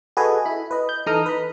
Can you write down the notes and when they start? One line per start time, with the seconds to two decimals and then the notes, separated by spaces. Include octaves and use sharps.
0.17 F#4 G#4 A4 B4 D#5 G#5
0.45 E4 B5
0.71 B4 D#5
0.89 G6
1.06 E3 D#4 A4 A#5 D#6 F6
1.26 B4 B5